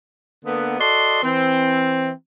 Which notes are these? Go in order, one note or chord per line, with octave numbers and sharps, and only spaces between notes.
D3 A#3 B3
F#4 A4 D5 D#5 C6
E3 C4